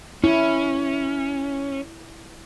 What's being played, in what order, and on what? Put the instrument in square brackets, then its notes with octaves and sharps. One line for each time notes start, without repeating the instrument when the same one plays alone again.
[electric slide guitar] C#4 [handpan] E4